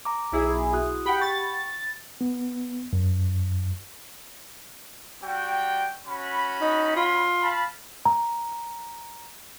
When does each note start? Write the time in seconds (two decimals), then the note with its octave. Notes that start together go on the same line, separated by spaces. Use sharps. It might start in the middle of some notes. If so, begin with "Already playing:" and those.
0.05 A#5 D6
0.32 B1 E4 G#4
0.73 F#4 D#6 F#6
1.06 G4 F#5 G5 B5
1.21 C#6 A6
2.21 B3
2.93 F#2
5.22 G3 F#4 G5
6.05 C#4 F#4 B5
6.61 D#4
6.96 F4
7.41 F5 A5 B5
8.05 A#5